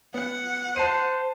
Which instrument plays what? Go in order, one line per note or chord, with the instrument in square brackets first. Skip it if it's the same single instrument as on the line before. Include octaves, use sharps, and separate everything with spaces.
[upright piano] B3 [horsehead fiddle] F#5
[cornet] C5 [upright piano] A5 C7 D#7